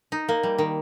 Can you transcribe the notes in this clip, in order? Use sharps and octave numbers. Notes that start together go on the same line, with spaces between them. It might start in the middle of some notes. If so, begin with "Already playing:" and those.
D#4
A#3
G3
D#3